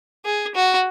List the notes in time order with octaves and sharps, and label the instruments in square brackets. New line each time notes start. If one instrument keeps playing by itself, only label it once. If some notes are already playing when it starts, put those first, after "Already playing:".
[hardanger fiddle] G#4
F#4